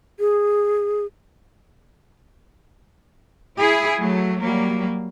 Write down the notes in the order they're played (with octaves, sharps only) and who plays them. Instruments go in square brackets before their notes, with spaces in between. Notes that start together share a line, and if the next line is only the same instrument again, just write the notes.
[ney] G#4
[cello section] E4 G#4
F#3 A3
F#3 G3 A#3